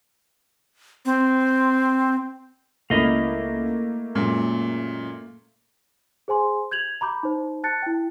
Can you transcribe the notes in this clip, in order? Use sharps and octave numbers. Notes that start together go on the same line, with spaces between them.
C4
C#2 A3 A#3 E4 D#5 F5
F#2 A#2 G#3
G#4 C5 G#5 C6
G6 G#6 F7 F#7
A#5 B5 D6 G6
D#4 C5
A5 F#6 A6 C#7
E4 G5